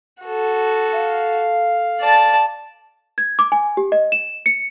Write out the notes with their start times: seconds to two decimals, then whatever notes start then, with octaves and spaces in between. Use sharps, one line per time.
0.22 F#4 A4
0.94 F5
2.01 D5 A5
3.18 G#6
3.39 D6
3.52 G#5
3.77 G4
3.92 D#5
4.12 E7
4.46 C#7